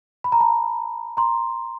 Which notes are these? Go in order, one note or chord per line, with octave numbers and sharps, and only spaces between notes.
B5
A#5
A5 B5
A#5 C6